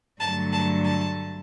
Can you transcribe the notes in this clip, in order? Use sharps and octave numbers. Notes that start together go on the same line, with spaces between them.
G2 D3 F#3 A3 A5
A5
A5